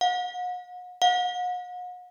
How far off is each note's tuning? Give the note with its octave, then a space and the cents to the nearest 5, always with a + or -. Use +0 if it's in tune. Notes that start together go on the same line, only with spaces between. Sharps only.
F#5 -45
F#5 -45